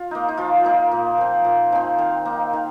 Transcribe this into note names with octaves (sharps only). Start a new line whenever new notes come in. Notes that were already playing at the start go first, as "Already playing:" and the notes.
Already playing: F4
A#3 D#4
D#4
F3 F4
A#3 D#4
A#2
F3 C4
A#2
F3 C4 D#4
D#3 F5
A#3 D#4
D#3